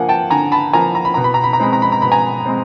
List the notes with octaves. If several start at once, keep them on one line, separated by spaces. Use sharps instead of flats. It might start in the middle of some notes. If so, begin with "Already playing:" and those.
Already playing: D3 F3 A#3 F#5 G#5
G5 A5
D3 G#5 A#5
A5 B5
F3 A#3 G#5 A#5
A#5
B5
B2 A#5
B5
A#5
B5
A#5
G#3 C4 B5
A#5
B5
A#5
B2 B5
G#5 A#5
G#3 C4